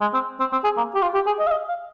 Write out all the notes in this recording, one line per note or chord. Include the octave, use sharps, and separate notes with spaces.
G#3
C4
C4
C4
G#4
A#3
G4
F4
G4
G#4
D#5
F5
D#5
F5